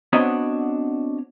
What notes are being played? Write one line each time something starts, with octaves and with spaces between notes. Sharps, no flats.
B3 C4 D4 F#4 C#5 D#5